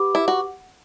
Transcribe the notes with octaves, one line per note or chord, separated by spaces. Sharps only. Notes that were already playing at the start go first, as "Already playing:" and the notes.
Already playing: G4 B4 F#5 B5 D6
E4
F#4